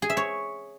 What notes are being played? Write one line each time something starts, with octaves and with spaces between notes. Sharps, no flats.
G#4
E5
C#5